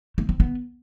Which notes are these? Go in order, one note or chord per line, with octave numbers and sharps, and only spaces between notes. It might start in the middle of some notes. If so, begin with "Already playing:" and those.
A3
C4
B3